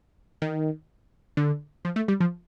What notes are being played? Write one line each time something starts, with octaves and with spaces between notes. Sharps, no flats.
D#3
D3
F3
A3
G3
F3